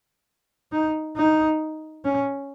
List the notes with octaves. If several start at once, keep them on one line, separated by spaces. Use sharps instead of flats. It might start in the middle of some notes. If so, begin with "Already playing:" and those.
D#4
D#4
C#4